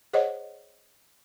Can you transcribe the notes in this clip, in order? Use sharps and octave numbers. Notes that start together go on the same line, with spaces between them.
G#4 C5 C#5 D#5 F#5